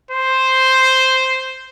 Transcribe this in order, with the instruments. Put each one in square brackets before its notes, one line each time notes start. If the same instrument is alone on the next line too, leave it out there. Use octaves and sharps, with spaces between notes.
[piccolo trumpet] C5